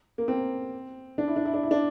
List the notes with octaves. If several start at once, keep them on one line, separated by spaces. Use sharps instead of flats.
A#3
C4
D4
E4
D4
E4
D4
E4
D4